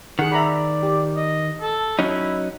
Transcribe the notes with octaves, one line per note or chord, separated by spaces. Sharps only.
D#3 G#4 F#5
D5 E5 A#5 B5
G4
D#5
A4
F#3 C#4 D#4 E4